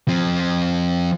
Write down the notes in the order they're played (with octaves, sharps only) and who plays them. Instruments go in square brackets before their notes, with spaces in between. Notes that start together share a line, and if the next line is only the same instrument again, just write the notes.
[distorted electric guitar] F3 C4